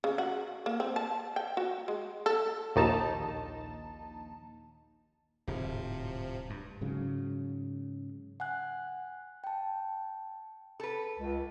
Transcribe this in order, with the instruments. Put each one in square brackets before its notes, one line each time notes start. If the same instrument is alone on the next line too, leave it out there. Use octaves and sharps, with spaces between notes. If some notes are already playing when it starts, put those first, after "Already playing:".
[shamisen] C#3
F#4
A#3
C4
A5
G5
F#4
G#3
A4
[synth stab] A#1 D#2 D#4 A5
[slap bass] D1 G#2 [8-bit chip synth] C3 F3
[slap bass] G2
[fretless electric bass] G#2 C#3 F#3
[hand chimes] F#5 G#5 F#6
G5 A5
[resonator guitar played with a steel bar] A4 B4
[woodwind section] C#2